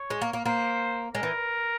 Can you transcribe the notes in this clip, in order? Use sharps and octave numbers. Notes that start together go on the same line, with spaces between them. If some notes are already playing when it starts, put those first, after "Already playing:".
Already playing: C#5
G#3
A#3
A#3
A#3 C5
G#3 A#4
E3